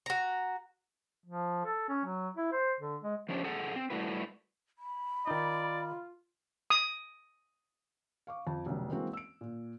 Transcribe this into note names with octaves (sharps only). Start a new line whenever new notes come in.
F#4 A#5
F3
A4
C#4
F#3
E4
C5
D3
G#3
F3 A3 C#4 D4 E4 G4
G#4 A4 F#5
C4
G3 A3 E4 F#4 B4
B5
D#3 D#4 F4 D5
D#6
F5 C#6 D6
F2 F5 A5
F1 B1
E3 G#3 A#3 C4 F#4
E6 D7
A#2